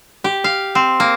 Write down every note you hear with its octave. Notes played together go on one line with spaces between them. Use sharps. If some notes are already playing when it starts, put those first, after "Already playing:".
G4
F5
C4
A#3